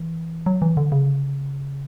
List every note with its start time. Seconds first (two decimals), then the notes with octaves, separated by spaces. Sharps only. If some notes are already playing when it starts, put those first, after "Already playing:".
Already playing: E3
0.46 F#3
0.62 E3
0.77 D3
0.92 C#3